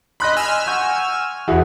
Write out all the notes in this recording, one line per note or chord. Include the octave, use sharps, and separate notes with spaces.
D#5 B5 C6 F#6 A#6
G#5 E6 F6
F#5 C#6 G6
E2 E3 E4 F#4 G#4